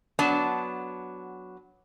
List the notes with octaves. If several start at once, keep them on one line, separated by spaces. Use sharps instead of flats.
F#3 B3 D4 A5